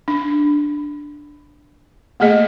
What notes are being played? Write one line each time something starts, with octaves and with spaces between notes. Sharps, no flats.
D4
A3 A#3 G#4 D#5